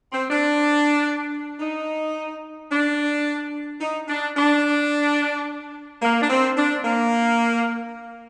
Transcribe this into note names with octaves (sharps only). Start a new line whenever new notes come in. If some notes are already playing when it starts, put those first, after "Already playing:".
C4
D4
D#4
D4
D#4
D4
D4
A#3
D4
C4
D4
A#3